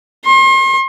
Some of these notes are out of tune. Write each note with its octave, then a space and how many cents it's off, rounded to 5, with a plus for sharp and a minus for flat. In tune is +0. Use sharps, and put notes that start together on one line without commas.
C6 +40